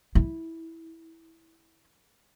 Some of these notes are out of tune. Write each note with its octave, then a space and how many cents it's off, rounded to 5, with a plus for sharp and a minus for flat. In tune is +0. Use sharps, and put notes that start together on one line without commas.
E4 -10